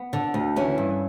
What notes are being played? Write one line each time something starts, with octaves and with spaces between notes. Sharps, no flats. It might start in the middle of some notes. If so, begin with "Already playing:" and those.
Already playing: B3
D3
D2
E3 C#4
G2